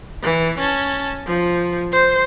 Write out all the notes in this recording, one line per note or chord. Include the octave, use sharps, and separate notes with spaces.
E3
C#4 A5
F3
C5